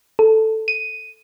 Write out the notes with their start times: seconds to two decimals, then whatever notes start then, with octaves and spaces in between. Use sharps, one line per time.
0.19 A4
0.68 D#7